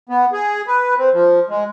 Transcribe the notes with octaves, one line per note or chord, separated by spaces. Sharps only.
B3
G#4
B4
C4
F3
G#3